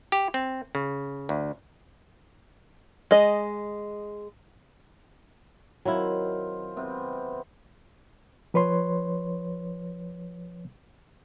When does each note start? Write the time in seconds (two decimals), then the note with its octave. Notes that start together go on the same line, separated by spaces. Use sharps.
0.12 G4
0.34 C4
0.75 C#3
1.29 D2
3.11 G#3 D#5
5.85 D#3 F#3 C4 E4 F4
6.77 C3 B3 C4
8.54 F3 B4 C#5 C6